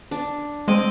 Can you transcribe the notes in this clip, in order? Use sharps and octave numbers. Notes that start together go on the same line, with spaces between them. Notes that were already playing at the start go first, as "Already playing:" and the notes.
D4
G#3 C4 D#5 D6